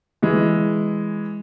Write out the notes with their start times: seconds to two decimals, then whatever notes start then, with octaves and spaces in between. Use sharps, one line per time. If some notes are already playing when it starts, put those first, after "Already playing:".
0.22 E3 G#3